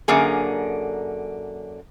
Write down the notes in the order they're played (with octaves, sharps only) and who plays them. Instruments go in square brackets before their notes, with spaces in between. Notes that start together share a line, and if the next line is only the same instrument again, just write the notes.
[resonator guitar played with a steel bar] F#2 D3 A#3 G#4